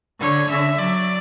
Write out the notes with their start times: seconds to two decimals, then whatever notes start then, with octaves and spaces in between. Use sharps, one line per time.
0.21 D3 C#5
0.50 D3 E5
0.79 F#3 D5